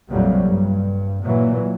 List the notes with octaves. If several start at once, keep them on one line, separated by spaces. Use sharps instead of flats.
A#1 F2 C3 F#3 G3
G2
A#2 E3 F#3